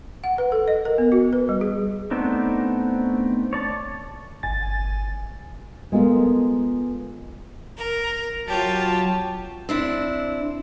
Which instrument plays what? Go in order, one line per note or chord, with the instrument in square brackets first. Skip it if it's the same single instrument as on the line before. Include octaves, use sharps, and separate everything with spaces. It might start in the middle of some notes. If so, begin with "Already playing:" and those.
[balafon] F#5
B4
A4
D#5
A#4
B3
F#4
B4
G3
G#4
[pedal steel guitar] A3 B3 C4 D4 D#4
C#5 D5 A5
[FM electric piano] G1 G#5 A6
[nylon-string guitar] G#3 B3 F4 A4 A#4
[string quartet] A#4
[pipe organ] F#3 A5 [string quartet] F4 G4 C#5
[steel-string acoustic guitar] C4 D4 E4